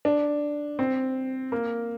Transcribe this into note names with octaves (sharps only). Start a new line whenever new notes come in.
D4
C4
A#3